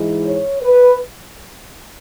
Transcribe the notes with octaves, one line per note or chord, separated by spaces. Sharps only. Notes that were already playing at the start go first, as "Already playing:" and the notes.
Already playing: G#2 E3 G#3
C#5
B4